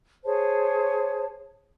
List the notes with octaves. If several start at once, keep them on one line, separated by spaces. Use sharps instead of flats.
G#4 C5 C#5 A5